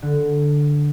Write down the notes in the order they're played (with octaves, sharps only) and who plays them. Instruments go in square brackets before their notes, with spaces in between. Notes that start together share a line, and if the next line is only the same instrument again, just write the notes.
[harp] D3